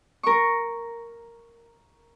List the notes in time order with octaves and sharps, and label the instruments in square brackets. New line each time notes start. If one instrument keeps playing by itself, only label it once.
[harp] A#4 C#6